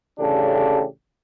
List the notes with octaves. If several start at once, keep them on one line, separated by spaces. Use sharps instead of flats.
A1 C#3 D4 G4 A4